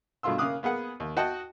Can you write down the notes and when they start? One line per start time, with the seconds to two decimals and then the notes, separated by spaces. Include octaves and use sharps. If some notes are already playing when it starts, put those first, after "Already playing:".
0.23 G2 B2 A3 F4 C6 E6
0.38 C#3 A#3 F5 D6 D#6 F#6
0.63 A#3 B3 G#4 F#5
1.00 D#2
1.17 F#4 D#5 F#5 G5 A5